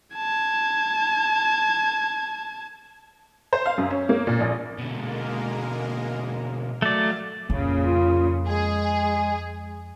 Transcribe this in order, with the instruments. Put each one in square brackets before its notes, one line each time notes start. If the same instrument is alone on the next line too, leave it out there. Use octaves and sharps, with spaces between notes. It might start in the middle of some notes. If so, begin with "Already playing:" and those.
[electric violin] A5 G#6
[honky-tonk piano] C5
F5
F#2
C#4
A#3
A#2
A#1
[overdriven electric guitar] B2 D3 [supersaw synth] G#3 A#3 A#4
[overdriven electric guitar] F#3 [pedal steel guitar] A3 D5 [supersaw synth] F5 F#5
[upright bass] F2 [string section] A#2 C#3
[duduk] F4
[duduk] G#3 [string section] G#4